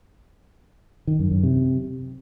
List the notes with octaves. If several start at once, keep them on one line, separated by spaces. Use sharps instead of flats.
D#3
F#2
F#2
C3